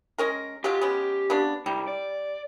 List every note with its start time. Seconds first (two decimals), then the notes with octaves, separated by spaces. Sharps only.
0.18 G#3 C#4 A#4
0.64 F#3 G#3 F4 G4
0.81 G#3 B3 C#4
1.30 C#3 B3 D4
1.66 C2 G3
1.88 D5